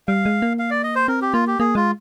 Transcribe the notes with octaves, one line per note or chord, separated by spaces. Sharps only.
G3 F5
G#3
A#3
F5
D5
D#5
C5
C4 A#4
G4
A#3 F4
G4
A#3 G#4
G#3 F4